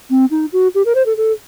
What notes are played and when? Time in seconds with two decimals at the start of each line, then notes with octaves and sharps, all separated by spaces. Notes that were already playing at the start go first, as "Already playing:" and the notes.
0.10 C4
0.31 D#4
0.53 F#4
0.75 G4
0.86 A#4
0.95 C5
1.06 A4
1.17 A4